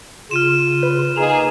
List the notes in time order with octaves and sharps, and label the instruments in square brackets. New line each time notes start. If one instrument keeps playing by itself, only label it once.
[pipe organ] C#3 F4 [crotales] F6 D#7 E7
[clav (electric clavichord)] B4
[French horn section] A#3 D#4 G#4 [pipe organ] A#5